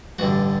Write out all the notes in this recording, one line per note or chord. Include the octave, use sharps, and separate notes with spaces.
A1 G2 D3 F#4